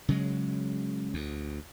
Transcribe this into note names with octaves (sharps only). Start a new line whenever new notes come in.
C#3 F#3 G#3
D2